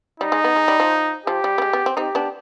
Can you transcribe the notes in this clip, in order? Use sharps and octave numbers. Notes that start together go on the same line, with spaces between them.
G3 D#4
G#3
B3
G#3
G3
F3
F3 G4
G3
B3
G#3
B3
C4
C4 D#4 G4
B3 D4